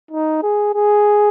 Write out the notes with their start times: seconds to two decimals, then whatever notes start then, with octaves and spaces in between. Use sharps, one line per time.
0.11 D#4
0.43 G#4
0.75 G#4